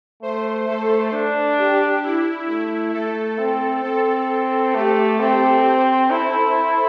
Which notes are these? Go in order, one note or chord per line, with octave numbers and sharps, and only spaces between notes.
A3 C5
A3 A4
D4
G4
E4
A3 E4
A3 A4
C4
C4 A4
A3 G4
C4 A4
C5
E4 A4